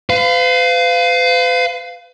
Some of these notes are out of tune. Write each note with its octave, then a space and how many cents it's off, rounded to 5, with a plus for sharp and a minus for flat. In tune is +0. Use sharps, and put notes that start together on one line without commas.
B4 +45 F5 +0